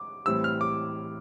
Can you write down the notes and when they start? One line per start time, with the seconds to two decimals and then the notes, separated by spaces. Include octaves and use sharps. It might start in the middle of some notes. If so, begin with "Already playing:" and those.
Already playing: D6
0.26 A2 E3 G3 C4 E6
0.44 F6
0.61 D6